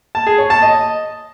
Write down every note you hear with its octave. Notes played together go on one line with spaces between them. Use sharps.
A5
G#4
C#5
A5
D#5